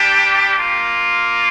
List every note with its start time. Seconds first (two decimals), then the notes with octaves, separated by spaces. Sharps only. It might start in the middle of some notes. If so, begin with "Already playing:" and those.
Already playing: G3 D4 G4
0.57 A#3 F4